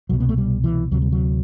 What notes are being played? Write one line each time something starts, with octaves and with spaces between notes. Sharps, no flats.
C2 B2 F#3
B3
A3
G3
E3
D2 C3 F#3
G3
F#3